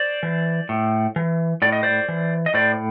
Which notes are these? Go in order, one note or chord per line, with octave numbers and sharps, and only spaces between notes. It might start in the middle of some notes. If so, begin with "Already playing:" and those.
Already playing: C5 D5
E3
A2
E3
A2 D5
D#5
C5 D5
E3
D#5
A2 C5 D5